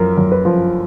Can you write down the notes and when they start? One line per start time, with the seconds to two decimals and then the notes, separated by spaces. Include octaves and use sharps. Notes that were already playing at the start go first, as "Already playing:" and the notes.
Already playing: F#2 F3 A#4
0.17 F#2
0.32 B4
0.45 F3